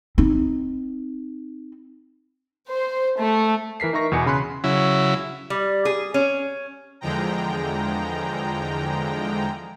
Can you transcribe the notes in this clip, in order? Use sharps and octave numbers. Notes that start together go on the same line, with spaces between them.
C4 D#4
C5
A3
E3 A#4 B6 C7
D#4 A#4 E5 C#6 A#6
E2 B2 G#5 C#7
C#3 B5 C6 F#6
C#3 F#3 E4
G3
G#4
C#4
E2 D3 F3 G#3 G5 A#5